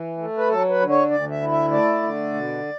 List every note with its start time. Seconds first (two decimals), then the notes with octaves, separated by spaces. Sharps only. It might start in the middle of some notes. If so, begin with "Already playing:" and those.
Already playing: E3
0.18 A3
0.37 B4
0.49 F#3 A4
0.69 B4
0.80 D3
0.89 C#5
1.10 D2 D5
1.31 E5
1.42 E4
1.52 E5
1.71 A3 D5
2.02 D3
2.34 B2